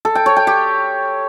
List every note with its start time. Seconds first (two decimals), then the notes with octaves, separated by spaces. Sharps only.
0.05 A4
0.15 G5
0.26 C#5
0.37 G5
0.47 G4